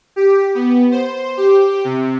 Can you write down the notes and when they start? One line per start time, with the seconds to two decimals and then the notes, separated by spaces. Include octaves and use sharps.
0.16 G4
0.55 B3
0.91 C5
1.37 G4
1.84 C3